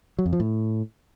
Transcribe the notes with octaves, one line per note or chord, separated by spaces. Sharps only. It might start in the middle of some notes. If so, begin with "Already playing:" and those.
F#3
F2
F3
A2